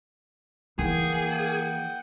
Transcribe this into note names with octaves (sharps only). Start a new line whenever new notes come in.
E3 A#3 G#4 F#5 G5